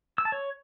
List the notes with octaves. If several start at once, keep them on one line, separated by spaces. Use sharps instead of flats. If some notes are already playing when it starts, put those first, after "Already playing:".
E6
A5
C#5